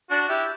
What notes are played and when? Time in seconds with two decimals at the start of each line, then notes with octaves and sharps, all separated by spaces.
0.10 D4 F#4
0.29 E4 G4